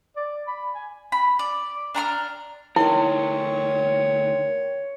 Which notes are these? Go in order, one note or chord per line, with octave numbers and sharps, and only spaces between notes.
D5
B5
G#5
B5
D5
D4 A#5 B5 F6
D2 D#4 E4 A#4 C#5 G5 C6